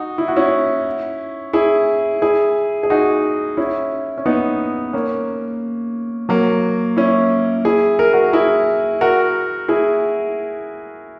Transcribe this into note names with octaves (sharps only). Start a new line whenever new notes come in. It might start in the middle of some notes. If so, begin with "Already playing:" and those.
Already playing: D#4 F#4
E4
F#4
C#4 E4
E4 G#4
E4 G#4
G#4
D#4 F#4
C#4 E4
C#4
B3 D#4
A#3 C#4
F#3 A#3
C#4 E4
E4 G#4
A#4
F#4 A#4
E4 G#4
F#4 A#4
E4 G#4